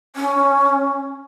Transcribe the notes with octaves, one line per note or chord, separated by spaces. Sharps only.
C#4